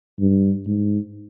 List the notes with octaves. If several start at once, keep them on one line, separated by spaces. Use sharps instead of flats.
G2
G#2